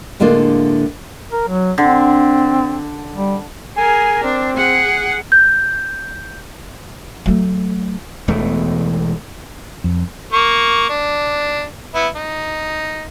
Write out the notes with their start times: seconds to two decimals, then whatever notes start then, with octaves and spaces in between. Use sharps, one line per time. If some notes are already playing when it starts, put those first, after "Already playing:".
0.20 A2 D3 G#3 A#3 D4 F4
1.32 A#4
1.48 F#3
1.78 D3 C4
3.15 G3
3.77 G#4 A#4 G#5
4.23 C4 D4
4.57 G#4 F#5
5.32 G6
7.26 F#3 A3
8.28 E1 E2 E3 A3
9.84 F2
10.33 A#3 C#6
10.90 D4
11.94 B3 E4
12.16 D#4